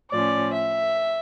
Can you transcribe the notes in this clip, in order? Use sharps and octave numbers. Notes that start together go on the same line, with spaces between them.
A2 F3 C#4 D5
E5